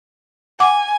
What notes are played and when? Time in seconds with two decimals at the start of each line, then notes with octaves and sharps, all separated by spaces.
0.60 F#5 G#5 D6